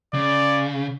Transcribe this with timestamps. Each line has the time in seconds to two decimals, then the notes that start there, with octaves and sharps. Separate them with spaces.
0.14 C#3 D5